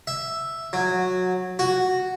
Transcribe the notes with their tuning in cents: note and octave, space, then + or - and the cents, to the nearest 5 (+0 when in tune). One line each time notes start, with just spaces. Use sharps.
E5 +0
F#3 -15
F#4 +0